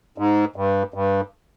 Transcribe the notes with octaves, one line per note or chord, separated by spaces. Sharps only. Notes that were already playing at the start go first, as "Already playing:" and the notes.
G#2
G2
G2